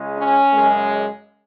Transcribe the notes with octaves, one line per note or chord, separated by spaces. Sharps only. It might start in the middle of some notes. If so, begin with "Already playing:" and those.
Already playing: C#2 C#3 G#3
C#4
F#2 C#3 G#3